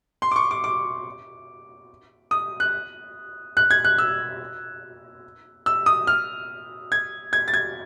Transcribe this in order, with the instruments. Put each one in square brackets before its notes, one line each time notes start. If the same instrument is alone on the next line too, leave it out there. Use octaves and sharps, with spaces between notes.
[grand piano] C6
D6
C#6
D6
D6
D#6
F#6
F#6
G#6
F#6
E6
E6
D#6
F6
G#6
G#6
A6
G#6